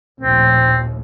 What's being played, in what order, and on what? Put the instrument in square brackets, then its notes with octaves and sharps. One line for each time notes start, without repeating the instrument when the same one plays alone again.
[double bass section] A#1 D#2 A2 [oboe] C4